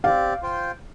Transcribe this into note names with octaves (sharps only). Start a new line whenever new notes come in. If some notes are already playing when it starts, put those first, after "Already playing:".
C4 G4 D5 F5
F4 C5 G5